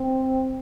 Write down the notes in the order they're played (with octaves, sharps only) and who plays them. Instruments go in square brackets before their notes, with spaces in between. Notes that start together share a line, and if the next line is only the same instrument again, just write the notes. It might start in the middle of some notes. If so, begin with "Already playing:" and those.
Already playing: [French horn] C4